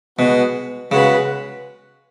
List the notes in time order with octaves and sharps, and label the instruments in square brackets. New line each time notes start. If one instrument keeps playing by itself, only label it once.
[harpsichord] B2 [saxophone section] G#3 B3 F#4 B4
[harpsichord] C#3 [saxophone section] G#3 B3 F#4 B4